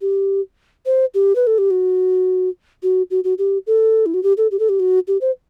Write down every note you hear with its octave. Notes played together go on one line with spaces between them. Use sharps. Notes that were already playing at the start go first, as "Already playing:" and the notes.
G4
C5
G4
B4
A4
G4
F#4
F#4
F#4
F#4
G4
A4
E4
F#4
G4
A4
G4
A4
G4
F#4
G4
C5